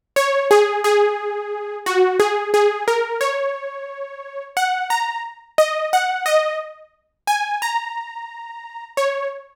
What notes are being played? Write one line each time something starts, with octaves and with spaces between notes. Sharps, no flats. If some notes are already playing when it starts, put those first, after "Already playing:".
C#5
G#4
G#4
F#4
G#4
G#4
A#4
C#5
F#5
A#5
D#5
F#5
D#5
G#5
A#5
C#5